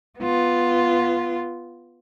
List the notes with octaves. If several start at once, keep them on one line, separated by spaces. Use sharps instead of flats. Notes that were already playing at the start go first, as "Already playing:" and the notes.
B3 F4